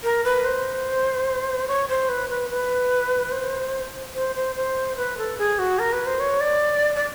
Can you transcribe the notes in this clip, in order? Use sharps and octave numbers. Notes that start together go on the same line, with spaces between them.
A#4
B4
C5
C#5
C5
B4
B4
B4
C5
C5
C5
C5
B4
A4
G#4
F#4
A#4
B4
C5
C#5
D5
D5